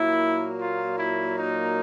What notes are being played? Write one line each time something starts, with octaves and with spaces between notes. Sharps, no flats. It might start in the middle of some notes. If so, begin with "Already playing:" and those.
Already playing: A#2 F#3 A#3 E4
F4
E4
D#4